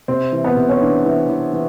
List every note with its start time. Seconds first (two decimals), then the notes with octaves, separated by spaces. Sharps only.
0.08 C3 C4
0.32 E3
0.44 B3
0.57 C3
0.69 C#4
0.81 E3 D4
1.05 E3
1.29 E3
1.53 E3